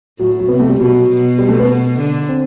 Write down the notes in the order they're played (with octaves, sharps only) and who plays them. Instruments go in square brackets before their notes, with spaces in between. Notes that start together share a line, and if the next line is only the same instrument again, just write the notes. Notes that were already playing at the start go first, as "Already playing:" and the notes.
[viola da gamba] A2 [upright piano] F#3
[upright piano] F#3
[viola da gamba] C3 [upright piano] B3
[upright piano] A3
G3
[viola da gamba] B2 [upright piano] F#3
[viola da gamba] B2
[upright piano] G3
A3
B3
[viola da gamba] D3
[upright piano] C4